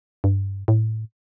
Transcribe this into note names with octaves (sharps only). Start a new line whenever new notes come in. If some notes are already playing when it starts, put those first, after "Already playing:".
G2
A2